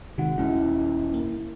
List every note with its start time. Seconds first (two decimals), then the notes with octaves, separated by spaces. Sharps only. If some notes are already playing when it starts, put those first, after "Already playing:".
0.18 C3 D#3 G#3 F#4 F#5
0.38 D#1 G#3 C#4 E4
1.14 A#3